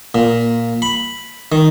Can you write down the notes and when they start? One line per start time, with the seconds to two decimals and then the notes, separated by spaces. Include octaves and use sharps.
0.15 A#2
0.82 B5
1.52 D#3